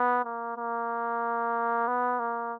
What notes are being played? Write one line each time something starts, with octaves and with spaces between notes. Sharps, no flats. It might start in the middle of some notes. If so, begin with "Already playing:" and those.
Already playing: B3
A#3
A#3
B3
A#3